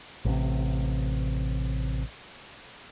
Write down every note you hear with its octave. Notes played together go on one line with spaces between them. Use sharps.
A1 C3